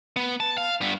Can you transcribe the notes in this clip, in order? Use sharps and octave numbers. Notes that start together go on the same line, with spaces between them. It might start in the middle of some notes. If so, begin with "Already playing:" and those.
B3
A5
F5
G2 B3